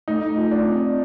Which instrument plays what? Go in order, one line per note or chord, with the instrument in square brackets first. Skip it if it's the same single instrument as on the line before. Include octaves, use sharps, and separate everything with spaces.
[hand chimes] A3 [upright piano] D#4
[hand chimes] F4
[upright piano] D4
[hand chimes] C4